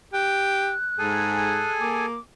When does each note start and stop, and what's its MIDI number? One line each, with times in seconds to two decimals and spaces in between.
0.13 0.73 67
0.13 1.73 90
0.99 1.67 44
0.99 2.06 68
0.99 2.06 69
0.99 2.06 80
1.80 2.16 58
1.80 2.20 86